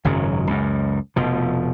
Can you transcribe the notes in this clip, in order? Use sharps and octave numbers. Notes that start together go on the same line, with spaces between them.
G#1 F#2 C#3 F#3
C#2 F#2
F1 B2 F3